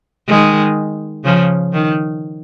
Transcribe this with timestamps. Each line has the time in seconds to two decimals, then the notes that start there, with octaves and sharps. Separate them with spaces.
0.28 D#3 G#3
1.25 C#3 F3
1.73 D#3